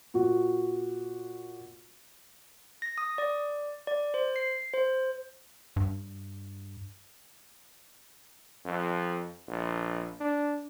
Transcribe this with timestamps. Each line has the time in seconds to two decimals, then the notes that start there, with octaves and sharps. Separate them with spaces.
0.14 A#2 F#4
2.82 A#6
2.98 D#6
3.18 D5
3.87 D5
4.14 C5
4.36 C7
4.74 C5
5.76 G2
8.65 F2
9.48 A#1
10.20 D4